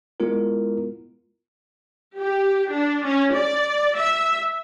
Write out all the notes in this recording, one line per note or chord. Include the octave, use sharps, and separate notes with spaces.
G#3 B3 E4 F4 A#4
G4
D4
C#4
D5
E5